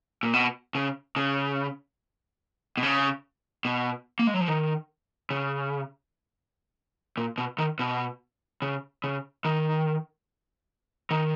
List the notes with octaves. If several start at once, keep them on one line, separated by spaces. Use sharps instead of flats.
A#2
B2
C#3
C#3
B2
C#3
B2
A#3
G#3
F#3
F3
D#3
C#3
A#2
B2
D#3
B2
C#3
C#3
D#3
D#3